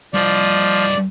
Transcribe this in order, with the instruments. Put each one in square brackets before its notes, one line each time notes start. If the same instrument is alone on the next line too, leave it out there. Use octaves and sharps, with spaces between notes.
[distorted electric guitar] G2 D#5 [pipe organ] F3 [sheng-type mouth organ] D5